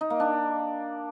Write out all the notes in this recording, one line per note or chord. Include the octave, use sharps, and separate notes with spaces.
D#4
A#3
D4